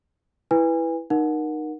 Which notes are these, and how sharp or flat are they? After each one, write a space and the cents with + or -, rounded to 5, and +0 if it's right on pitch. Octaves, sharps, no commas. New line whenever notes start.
E4 +5 B4 +0 G#5 -30
D#4 -20 A#4 +20 F#5 -15